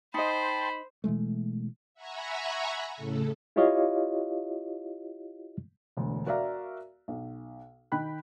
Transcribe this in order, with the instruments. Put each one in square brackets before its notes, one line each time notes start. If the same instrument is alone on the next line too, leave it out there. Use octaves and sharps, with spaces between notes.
[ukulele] D#4 D#5 [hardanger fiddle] C5 [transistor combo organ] G5 A5 C6 [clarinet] B5
[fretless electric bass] B2 E3 G#3 A3
[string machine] E5 F#5 G#5 A#5 B5 C#6
A2 C#3 A4
[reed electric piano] E4 F4 G4 C#5 D#5 F5
[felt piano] E1 D2
F#4 A#4 D5 E5 F5 A#5
B1
D#3 G5 B5 F#6